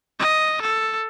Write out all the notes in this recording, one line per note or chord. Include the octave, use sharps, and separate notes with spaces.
D#5
A4